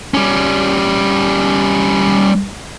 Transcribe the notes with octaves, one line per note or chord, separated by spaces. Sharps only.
G3 C#4